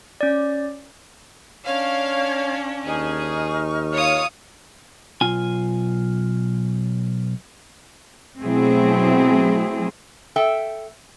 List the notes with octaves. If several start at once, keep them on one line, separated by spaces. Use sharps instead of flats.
C#4 D5
C#4 D4 C#5 F5 G#6
D#2 D#4 G#4 C#6 F6
F4 C#5 F5 D#6
B1 F4 G#5
B2 F#3 A3 C4 E4 G#4
A4 E5 G5